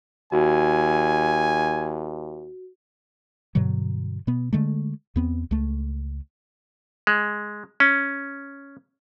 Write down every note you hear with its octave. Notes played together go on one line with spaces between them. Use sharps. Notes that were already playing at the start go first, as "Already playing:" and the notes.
D#2 F#4 G#5
G2 B2 D3 F#3
B2 B3
D3 G#3 A3
E2 B3 C4
C#2 A3
G#3
C#4